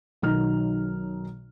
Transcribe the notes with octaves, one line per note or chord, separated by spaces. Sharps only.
B1 D#3 F#3 D#4 F6